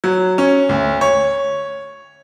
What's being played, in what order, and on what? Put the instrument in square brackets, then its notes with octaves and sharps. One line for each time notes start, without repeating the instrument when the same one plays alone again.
[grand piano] F#3
C#4
D2
C#5